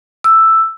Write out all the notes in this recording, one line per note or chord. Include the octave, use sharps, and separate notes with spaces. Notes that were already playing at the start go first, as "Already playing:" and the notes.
E6